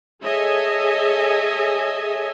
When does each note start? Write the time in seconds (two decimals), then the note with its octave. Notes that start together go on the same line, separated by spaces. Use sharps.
0.23 G#4 A4 C#5 D#5 E5 G#5